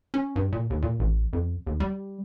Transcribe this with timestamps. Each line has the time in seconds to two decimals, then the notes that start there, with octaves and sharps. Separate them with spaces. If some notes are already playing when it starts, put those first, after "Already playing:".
0.14 C#4
0.36 G2
0.53 A#2
0.70 D#2
0.82 A#2
0.99 A1
1.33 F2
1.67 D#2
1.80 G3